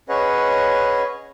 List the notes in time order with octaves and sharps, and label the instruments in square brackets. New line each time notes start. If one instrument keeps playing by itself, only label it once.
[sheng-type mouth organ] C#4 G#4 B4 C#5 D#5 F#5